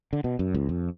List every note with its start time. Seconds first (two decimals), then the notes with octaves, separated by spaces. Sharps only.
0.13 D3
0.24 B2
0.39 F#2
0.54 C#2
0.69 F2